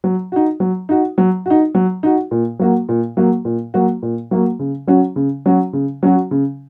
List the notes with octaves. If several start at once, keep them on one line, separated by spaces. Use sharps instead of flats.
F#3
D#4 F#4
F#3
D#4 F#4
F#3
D#4 F#4
F#3
D#4 F#4
A#2
F#3 A#3 F#4
A#2
F#3 A#3 F#4
A#2
F#3 A#3 F#4
A#2
F#3 A#3 F#4
C#3
F#3 C#4 F#4
C#3
F#3 C#4 F#4
C#3
F#3 C#4 F#4
C#3